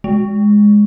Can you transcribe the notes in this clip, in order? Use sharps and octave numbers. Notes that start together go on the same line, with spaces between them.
G#3